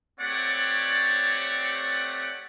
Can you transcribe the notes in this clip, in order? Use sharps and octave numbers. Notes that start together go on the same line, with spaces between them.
A3 C4 G4 C#5 D5 F#5